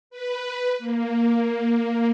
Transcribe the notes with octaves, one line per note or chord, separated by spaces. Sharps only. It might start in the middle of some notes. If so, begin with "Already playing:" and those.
B4
A#3